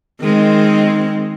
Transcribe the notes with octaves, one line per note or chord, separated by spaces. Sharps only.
D#3 G#3 C4